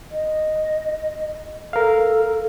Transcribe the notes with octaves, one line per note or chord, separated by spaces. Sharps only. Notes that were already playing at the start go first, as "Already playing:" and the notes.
D#5
A4 A#4 F5